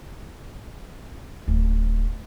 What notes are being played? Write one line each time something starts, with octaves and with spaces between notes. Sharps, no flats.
D1